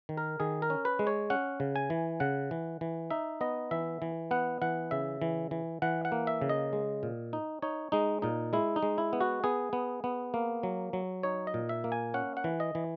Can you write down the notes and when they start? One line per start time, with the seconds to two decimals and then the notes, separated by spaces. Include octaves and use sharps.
0.09 D#3
0.17 A#4
0.40 D#3 G#4
0.62 A#4
0.70 C#4
0.85 B4
0.99 G#3
1.07 C#5
1.30 C#4 F#5
1.60 C#3
1.76 G#5
1.90 E3
2.20 C#3 F#5
2.51 E3
2.81 E3
3.11 D#4 E5
3.41 B3 D#5
3.71 E3 E5
4.02 E3
4.31 B3 F#5
4.62 E3 F#5
4.91 C#3 E5
5.22 E3
5.51 E3
5.82 E3 F#5
6.05 F#5
6.12 A#3
6.27 E5
6.42 C#3
6.49 D#5
6.73 G#3
7.03 A#2
7.33 D#4
7.62 D#4 C#5
7.92 G#3 D#4
8.22 A#2 D#4
8.53 G#3 E4
8.76 D#4
8.83 G#3
8.98 E4
9.13 B3
9.21 F#4
9.44 B3 G#4
9.73 B3
10.04 B3
10.34 A#3
10.63 F#3
10.93 F#3
11.23 D#4 C#5
11.47 D#5
11.54 A#2
11.69 E5
11.84 A#3
11.92 G#5
12.14 C#4 F#5
12.37 F#5
12.44 E3
12.60 D#5
12.75 E3